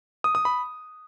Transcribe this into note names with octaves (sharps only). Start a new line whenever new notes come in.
D#6
D#6
B5